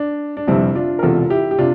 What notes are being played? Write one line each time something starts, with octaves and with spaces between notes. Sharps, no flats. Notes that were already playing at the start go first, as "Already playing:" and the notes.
Already playing: D4
D4
G1 F2 C3 G3 C4 E4
D4 F4
A#4
E1 E2 C3 F4 A4
E4 G4
G4
C3 D4 F4